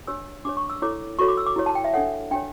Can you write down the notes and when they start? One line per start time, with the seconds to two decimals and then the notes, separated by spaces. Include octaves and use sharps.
0.07 D4 G4 C#5 E6
0.45 D4 G4 C#5 D6
0.57 C#6
0.70 E6
0.82 E4 A4 C#5 D6
1.19 F#4 A4 C#5 C#6
1.28 D6
1.37 E6
1.46 D6
1.56 E4 G4 C#5
1.66 A5
1.75 G5
1.84 E5
1.93 D4 A4 C#5 F#5
2.31 D4 G4 C#5 G5